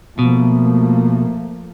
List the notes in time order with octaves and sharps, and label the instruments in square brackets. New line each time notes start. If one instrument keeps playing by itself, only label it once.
[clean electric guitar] B2 [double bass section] F3 A3 A#3